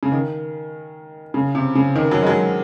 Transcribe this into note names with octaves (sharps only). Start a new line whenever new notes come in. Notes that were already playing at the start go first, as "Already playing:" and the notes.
C#3
D#3
C#3
C3
C#3
D#3
F#3
G#3
F#3